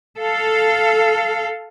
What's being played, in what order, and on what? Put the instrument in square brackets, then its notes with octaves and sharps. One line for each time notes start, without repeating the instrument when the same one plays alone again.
[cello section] A4 F5